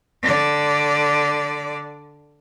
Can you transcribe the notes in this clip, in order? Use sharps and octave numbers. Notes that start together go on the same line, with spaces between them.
D3 D5